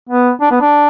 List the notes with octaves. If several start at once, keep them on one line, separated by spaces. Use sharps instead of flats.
B3
D4
B3
D4